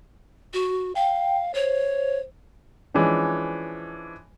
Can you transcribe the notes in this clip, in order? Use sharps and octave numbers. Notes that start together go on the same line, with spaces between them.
F#4
F5 G5
C5 C#5
E3 F3 G#3 C#4 D4